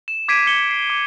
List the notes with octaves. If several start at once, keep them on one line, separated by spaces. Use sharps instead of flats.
E7
D6 G#6 B6 C7 D7 D#7
D6 G#6 B6 C#7 E7 G7
C7
D6